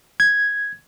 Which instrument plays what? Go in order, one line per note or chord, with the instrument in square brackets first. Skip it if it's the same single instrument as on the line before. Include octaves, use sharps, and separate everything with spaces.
[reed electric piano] G#6